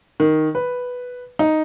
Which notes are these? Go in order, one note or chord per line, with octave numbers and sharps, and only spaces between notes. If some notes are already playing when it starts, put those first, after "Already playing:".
D#3
B4
D#4